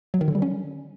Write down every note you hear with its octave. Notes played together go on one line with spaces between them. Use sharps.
F#3
D#3
D3
G3
C#4